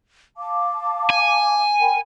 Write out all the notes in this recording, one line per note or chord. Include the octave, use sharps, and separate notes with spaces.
F5 A5 D6
G#5
A#4 G5 B5